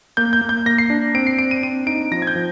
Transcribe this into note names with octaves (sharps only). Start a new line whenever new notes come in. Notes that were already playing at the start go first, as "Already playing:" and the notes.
A#3 G6
G6
A#3
G6
A#3 A#6
C7
D4
C4 D7
C7
C4 D7
D#7
C4 D#7
D#4 D7
F3 A#6
G#6
G6
F3